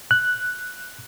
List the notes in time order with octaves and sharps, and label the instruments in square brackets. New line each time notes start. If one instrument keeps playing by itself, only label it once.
[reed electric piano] F#6